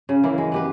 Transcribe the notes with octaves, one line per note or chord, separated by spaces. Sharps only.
C#3
E3 A#3 E4
G#3
B3 G4 B4